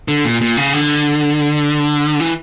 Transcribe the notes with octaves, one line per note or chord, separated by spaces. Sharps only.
D3
A#2
A#2
C#3
D3
E3